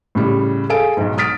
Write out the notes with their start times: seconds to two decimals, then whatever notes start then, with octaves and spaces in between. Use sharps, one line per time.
0.15 A2 C#3 G3
0.70 G#4 A4 F5 G#5 D7
0.97 B1 G#2
1.18 D#6 F6 A6 B6 D7